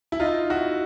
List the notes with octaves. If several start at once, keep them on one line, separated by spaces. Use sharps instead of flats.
E4
D#4 F4
E4 F#4